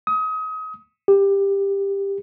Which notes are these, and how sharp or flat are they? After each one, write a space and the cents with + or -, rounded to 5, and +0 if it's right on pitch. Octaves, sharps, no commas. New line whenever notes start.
D#6 +30
G4 +15